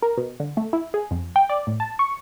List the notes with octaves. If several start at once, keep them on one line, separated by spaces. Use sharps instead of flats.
A#4
B2
D3
A3
E4
G#4
F2
G5
D5
A2
A5
C#6